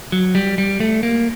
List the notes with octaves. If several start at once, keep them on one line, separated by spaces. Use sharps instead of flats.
F#3
G3
G3
A3
A#3